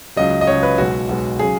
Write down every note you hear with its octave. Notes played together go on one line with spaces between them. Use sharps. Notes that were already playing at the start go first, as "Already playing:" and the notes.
C#2 C#3 F#3 D#5
D#5
C#2 C#3 F#3 C#5
B4
B1 B2 G#3 F#4
B1 B2 G#3
C#3 F#3 G#4